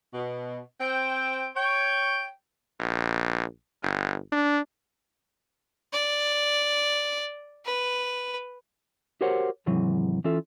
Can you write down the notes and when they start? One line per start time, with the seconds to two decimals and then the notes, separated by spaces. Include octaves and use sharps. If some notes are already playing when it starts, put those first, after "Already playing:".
0.14 B2
0.80 C4 G5
1.55 C#5 G5
2.80 A#1
3.82 G1
4.32 D4
5.93 D5
7.65 B4
9.21 F#4 G4 A#4 C5 C#5 F#5
9.66 D#2 G#2 C3 E3 F#3
10.24 E3 C#4 F4 A4 E5